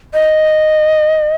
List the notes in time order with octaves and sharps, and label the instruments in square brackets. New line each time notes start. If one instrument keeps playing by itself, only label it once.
[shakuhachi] D#5